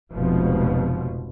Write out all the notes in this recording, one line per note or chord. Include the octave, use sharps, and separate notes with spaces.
F1 C#2 B2 F3 B3